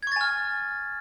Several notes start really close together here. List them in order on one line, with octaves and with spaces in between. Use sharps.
G#6 C#6 A6 G#5 F6